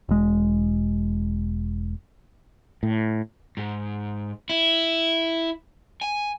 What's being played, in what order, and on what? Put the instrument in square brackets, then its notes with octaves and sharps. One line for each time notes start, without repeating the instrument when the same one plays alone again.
[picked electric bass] E1 G#3
[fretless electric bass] A2
[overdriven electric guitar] G#2
E4
G#5